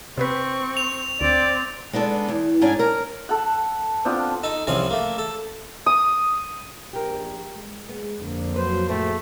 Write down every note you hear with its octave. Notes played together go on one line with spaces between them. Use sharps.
C3 B3 C4 B4 C#6
F7
D2 C4 D5
G#3 B3 D4 A4
E2
G#2 C#4 D4 G#5
A#4
A4 F#5
B3 C4 D4 F4
D#4 A4
C2 F3 C4 C#4 G#5
A3 A#3
A4
D#6
A#1 G4 A#4
G#3
G#3 B3
F2 A#2 D3 A#3
F#3 B4 C5
A2 A3 C4 F4 F#4 G#4